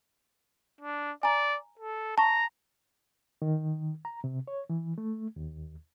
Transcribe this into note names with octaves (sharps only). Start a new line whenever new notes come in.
D4
D5 G#5 A#5
A4
A5 A#5 C#6
D#3
A#5
C3
C#5
E3
A3
D#2